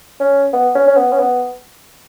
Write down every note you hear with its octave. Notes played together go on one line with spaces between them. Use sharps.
C#4
B3
C#4
C#4
B3
C#4
B3